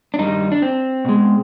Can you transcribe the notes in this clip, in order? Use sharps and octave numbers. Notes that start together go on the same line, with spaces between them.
D4
G2 D#3 G3 D#4
D4
C4
B2 G#3